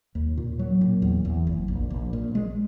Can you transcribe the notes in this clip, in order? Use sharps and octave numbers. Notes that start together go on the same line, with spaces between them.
D#2
A#2
F#3
A#2
E2
E2
F#1
A#1
A#1
A#2
G#3